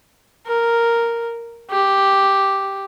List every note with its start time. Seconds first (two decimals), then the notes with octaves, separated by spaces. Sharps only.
0.47 A#4
1.71 G4